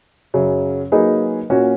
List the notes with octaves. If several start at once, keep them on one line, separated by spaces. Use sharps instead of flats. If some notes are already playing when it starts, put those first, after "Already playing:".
F#2 C#3 F#3 C#4
F#3 A#3 D#4 G#4 B4
A#2 A#3 C#4 F#4